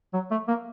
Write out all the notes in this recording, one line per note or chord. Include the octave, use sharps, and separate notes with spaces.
F#3
A3
A#3